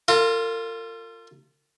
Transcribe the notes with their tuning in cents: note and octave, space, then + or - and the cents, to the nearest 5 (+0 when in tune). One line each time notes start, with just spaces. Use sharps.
F4 +0 A#4 -45